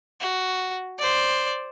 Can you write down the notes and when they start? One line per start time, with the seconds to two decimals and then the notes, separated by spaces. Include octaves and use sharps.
0.21 F#4
0.99 C5 D5